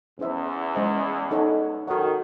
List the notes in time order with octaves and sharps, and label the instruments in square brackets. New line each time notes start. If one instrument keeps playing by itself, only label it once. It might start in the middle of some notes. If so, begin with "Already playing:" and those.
[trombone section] E2 [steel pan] C#4 E4 C5 E5
[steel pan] G#3 C#4 E4 C5 D#5
D#4 A4 C#5 F#5
[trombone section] D#3 [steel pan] F#4 A4 C#5 F#5